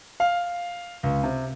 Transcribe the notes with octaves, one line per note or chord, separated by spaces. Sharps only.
F5
C#2
C3